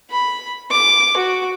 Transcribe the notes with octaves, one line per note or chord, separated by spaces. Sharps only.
B5
D6
F#4